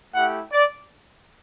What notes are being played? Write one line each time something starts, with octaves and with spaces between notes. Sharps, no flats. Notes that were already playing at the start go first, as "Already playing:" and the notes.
A3 E4 G4 F#5
D5